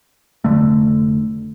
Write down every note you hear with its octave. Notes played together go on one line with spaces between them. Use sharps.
F1 C#2 D3 A3